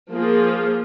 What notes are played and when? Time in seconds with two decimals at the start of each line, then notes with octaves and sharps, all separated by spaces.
0.11 F3 A#3 F4 G#4